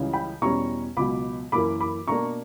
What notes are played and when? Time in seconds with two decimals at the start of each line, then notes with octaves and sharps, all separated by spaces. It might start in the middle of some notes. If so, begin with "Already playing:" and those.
Already playing: C#2 C#3 E3 G3 C#4
0.13 G5 B5
0.42 E2 B2 G3 C#4 A#5 C#6
0.97 C#2 B2 F#3 B5 D6
1.52 F#2 E3 A#3 B5 D6
1.80 B5 D6
2.07 B2 A#3 D4 A#5 C#6